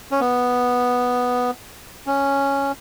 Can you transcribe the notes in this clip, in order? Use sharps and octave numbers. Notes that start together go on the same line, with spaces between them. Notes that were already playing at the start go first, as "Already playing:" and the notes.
C#4
B3
C#4